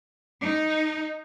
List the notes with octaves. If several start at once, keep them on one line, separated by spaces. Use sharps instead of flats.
D#4